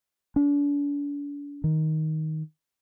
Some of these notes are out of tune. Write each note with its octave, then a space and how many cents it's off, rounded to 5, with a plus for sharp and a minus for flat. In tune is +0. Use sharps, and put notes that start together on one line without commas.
D4 -40
D#3 +10